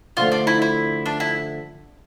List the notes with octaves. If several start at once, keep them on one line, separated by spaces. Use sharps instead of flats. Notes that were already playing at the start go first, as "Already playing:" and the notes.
D3 F3 A3 F4
D4
E4
E4
D4
E4